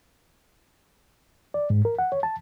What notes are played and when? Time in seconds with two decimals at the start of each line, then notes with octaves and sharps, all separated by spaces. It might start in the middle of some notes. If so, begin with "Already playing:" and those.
1.54 D5
1.70 G#2
1.85 A#4
1.99 F#5
2.12 C#5
2.23 A5